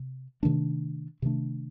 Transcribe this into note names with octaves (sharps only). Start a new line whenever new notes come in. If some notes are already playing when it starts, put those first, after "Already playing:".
Already playing: C3
C3 D#3 A3 D4
C3 D#3 A3 D4